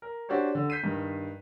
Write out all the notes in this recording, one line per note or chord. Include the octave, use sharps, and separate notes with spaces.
A#4
D4 F#4 G4 C5 C#5
D3
G6 B6 C7 D#7
G2 D#3